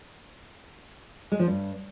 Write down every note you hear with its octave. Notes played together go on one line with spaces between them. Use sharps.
G#3
F3
G2